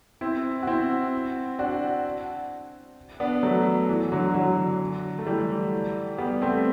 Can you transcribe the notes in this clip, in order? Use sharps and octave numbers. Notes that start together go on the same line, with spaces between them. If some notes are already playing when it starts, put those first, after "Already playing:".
C4 E4
F#4
C4 E4
D4 F#4
B3 D4
F#3 A3
E3
D3 F#3
D3 F#3
A3
E3 G3
G3 B3
A3 C4